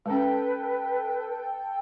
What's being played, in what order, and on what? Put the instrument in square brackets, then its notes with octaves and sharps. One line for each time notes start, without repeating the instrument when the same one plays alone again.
[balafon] G#3 C#4 [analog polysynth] A4 G5 [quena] B4